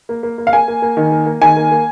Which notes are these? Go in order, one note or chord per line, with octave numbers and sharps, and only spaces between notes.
A#3
A#3
A#3
F5
A#3 G#5
A#3
A#3
D#3
A#3
A#3
D#3 G#5
A#3
A#3